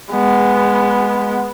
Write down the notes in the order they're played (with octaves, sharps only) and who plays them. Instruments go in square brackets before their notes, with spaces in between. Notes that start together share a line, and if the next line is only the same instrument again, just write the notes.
[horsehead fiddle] G#3 B3